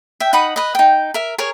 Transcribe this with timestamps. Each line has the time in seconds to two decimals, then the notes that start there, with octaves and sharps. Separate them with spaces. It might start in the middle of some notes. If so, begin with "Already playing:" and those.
0.20 E5 G5
0.33 D#4 F#5 B5 D#6
0.56 B4 D#5
0.75 D#4 G5
1.14 A#4 E5
1.38 G#4 A#4 C#5